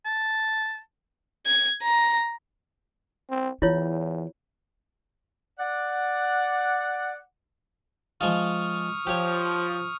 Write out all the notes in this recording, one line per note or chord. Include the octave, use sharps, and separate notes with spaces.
A5
G#6
A#5
C4
E2 E3 E4 F4 C#5
D5 F#5
F3 G#3 F4 C#6 D#6 F6
F3 G4 C#5